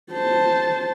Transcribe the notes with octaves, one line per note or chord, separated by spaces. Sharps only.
C5 A5